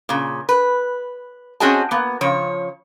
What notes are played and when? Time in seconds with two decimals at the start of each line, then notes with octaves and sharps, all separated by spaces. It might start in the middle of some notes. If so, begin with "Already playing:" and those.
0.09 A#2 C#3
0.49 B4
1.60 C4 C#4 F#4 G#4 D#5 A5
1.91 A#3 B3
2.21 C#3 F3 C#5